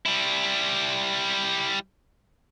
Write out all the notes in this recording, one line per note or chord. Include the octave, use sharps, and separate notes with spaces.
G3 E4